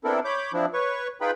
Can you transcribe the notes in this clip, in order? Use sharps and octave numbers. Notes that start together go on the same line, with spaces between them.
B3 C4 D4 E4 A4 A#4
C#5 B5 D6 G6
F3 C4 D4 E4
B4 C#5 C#6
D#4 F4 G#4 B4 G5 B5